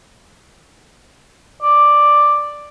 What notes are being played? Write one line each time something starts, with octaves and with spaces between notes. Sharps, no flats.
D5